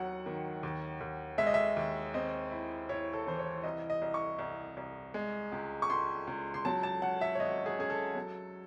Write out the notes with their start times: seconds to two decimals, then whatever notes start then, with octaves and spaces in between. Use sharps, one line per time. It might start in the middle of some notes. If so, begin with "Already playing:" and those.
Already playing: D#2 D#3 F#3 F#5
0.26 D#3
0.63 D#2
1.00 D#2
1.38 G#3 E5
1.46 D#5
1.54 E5
1.76 D#2
2.14 C4 D#5
2.51 E4
2.89 E4 C#5
3.13 A4
3.27 E3 C5
3.39 C#5
3.63 C2 D#5
3.90 D#5
4.02 C2
4.14 C#6
4.39 C2
4.77 C2
5.14 G#3
5.52 C#2
5.82 C#6
5.90 C#2 C6
6.27 C#2
6.54 C6
6.65 F#3 A5
6.83 A5
7.02 C#4 F#5
7.21 E5
7.35 C#5
7.40 G#1 D#5
7.66 G#4
7.78 C#4 G#4
7.90 A4
8.15 F#3